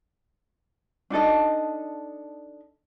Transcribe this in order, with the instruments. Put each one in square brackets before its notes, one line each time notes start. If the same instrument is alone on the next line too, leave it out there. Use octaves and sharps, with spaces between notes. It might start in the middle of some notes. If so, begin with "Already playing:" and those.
[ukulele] D4 D#4 A4 D#5